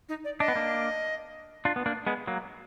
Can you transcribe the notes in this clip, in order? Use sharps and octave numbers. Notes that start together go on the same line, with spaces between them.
D#4
D5
D4 D#5
B3
A#3 D4
D4 F4
B3
A#3 D4
G#3 B3
F#3 A#3